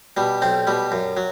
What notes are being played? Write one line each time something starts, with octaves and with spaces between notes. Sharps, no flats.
B2 G3
B1 C4
B2 G3
F#2
F#3